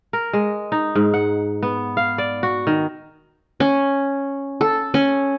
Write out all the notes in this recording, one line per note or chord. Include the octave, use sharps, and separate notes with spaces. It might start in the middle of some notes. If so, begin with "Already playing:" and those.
A#4
G#3
D#4
G#2
F#5
B3
F5
D5
F#4
D#3
C#4
A4
C#4